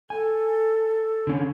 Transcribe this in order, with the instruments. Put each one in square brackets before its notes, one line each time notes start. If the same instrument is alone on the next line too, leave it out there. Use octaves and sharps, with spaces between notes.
[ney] A4 [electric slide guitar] G#5
[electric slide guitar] D3 C#4